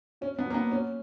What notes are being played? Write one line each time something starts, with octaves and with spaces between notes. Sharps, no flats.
B2 C#4
B3
F#3 A#3
B3
B2 C#4